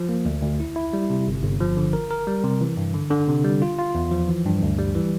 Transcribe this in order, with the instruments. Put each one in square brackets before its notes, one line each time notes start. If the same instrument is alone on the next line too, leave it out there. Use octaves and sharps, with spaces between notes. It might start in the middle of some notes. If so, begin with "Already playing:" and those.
Already playing: [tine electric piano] F3
A#3
D2
D2
E4
E4
G3
C3
G1
G1
F3
D3
A#4
A#4
G3
C3
E3
G2
D3
D3
C3
G3
F4
F4
E2
F3
E3
G2
D2
G3
E3